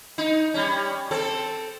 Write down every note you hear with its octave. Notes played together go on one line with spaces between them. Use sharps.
D#4
G3 C#4
C4 A4